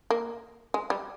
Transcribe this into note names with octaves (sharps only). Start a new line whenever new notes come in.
A#3
G#3
G3